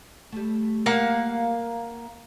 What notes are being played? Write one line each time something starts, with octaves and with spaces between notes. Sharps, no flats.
G3 A3
A#3 F5 F#5